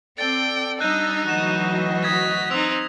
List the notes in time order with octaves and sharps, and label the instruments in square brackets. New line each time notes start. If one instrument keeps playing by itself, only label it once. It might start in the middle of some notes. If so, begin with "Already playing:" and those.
[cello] C4 [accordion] A4 D5 [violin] G5 [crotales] A6
[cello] G3 D4 [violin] D#4 [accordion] D#5 E6 [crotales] F#6 G6 D#7
[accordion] D2 F#4 D#5 [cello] E3 F#3 [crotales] F#6 E7
[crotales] D#6 G#6 A#6 [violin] B6
[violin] C4 D#4 [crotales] E6 B6 F7